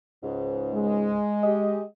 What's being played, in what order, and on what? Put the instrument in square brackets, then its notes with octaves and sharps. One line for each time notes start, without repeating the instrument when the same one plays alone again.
[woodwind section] C#2 G#2
[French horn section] G#3
[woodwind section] G4 G#4 D#5